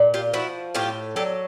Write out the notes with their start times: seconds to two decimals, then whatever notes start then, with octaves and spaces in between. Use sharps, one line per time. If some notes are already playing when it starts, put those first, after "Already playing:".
Already playing: A#2
0.14 F4 G4
0.34 F3 E4 F#4
0.75 A2 F4 G4
1.16 F#3 G4 A4